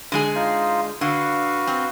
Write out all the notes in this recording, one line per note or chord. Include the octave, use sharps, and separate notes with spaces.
D3 G#3 G#4
D#4 F4 C5
D3 F#4 B4 F5
C4